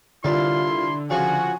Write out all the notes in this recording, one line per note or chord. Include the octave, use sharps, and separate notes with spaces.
C2 D3 E4 F4 A#4 D5 C6
C#3 F3 F#4 G#5 C#6